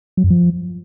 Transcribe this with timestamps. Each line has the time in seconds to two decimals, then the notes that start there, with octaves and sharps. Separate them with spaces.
0.17 F#3
0.24 F#2
0.30 F3